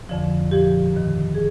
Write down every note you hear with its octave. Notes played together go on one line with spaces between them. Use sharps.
F2 D3 F3
A#2 F3 G4
G2 D#3
G#4